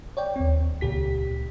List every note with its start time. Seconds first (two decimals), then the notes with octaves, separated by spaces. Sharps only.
0.17 C#5 D5 G5
0.36 D#2 C4
0.81 C#2 A#2 G4 B6